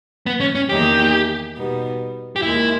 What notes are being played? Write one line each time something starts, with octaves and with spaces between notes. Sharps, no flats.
B3
C#4
C#4
E2 D#3 A#3 D#4 G4 G#4
B2 G3 B3 D#4
G4
D#2 D#3 G#3 E4